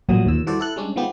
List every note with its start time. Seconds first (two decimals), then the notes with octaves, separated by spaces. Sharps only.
0.09 A1 A#2 F#3 G3 D#6
0.26 D#2 A#2 E6
0.47 E3 G3 F#4 A4 C5 D5
0.59 E4 A4 F#6
0.76 G3 G#3 C#4 D4
0.96 D#3 F3 G#3 B3 G4